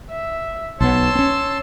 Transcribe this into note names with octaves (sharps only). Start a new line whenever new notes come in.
E5
B1 G3 B3 C#5 A5 C6 E6
C4 C#4